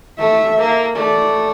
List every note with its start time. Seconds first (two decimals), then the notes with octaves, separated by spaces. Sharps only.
0.18 A3 E5
0.58 A#3
0.96 A3 D5